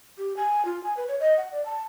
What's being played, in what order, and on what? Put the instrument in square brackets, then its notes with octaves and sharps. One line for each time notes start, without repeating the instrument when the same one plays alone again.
[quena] G4
G#5
F4
G#5
B4
C#5
D#5
F#5
D5
A5